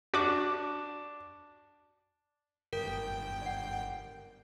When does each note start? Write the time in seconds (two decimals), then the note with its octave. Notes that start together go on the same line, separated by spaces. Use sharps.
0.14 D4 F#4 D6
2.73 G1 A#4 G5
3.42 D5 F#5